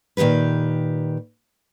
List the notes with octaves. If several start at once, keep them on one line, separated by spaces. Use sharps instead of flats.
A#2 D#3 F3 G4 B4